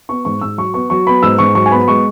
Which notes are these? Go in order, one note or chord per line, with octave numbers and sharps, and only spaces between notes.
B3 C#6
G#2 C#6
G#2 E6
F#3 C#6
B3 C#6
F#3 C#6
B3 B5
G#2 E6
G#2 C#6
F#3 C#6
G#5
B3 B5
G#3 C#6